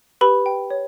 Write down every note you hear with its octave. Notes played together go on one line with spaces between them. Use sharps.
G4 B4 B5
G5
C#5